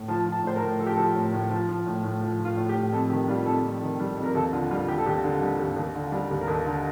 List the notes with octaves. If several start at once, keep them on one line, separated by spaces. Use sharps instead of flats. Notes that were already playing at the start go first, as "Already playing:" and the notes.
Already playing: A2
F3 A5
F3
A5
A2 C5
A#4
A2
F3 A4
G4
F3 A4
A2
A2
F3
F3
A2
A2
F3
F3
F4
A2
G4
A2
F2 A4
A4
D#3 G4
G3 F4
F2 A4
F2
D#3
G3
F2
A#4
D#2 A4
D3 F4
G3 F4
D#2 G4
A4
D#2 G4
D3
G3
D#2
D#2
D3
G3
D#2
A#4
D#2 A4
D3